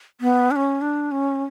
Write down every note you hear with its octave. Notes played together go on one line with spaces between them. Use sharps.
B3
D4
C#4
D4
C#4